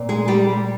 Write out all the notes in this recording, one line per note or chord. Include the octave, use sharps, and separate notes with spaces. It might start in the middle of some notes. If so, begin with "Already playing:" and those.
Already playing: A#2 C4
G#3 G#4
G3 G4